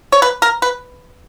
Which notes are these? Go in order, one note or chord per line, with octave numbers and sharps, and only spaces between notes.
C#5
B4
A#4
B4